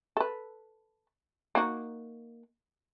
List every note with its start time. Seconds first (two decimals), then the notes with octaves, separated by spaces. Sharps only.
0.17 A4 B4
1.55 A#3 D#4 F#4